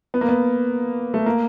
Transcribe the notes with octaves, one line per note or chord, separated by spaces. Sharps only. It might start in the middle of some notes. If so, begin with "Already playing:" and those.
B3
A#3
B3
A3
A#3